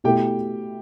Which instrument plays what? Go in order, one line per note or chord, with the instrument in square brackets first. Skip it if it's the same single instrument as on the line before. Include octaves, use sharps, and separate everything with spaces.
[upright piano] B2 A3 E4 [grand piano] G4 G5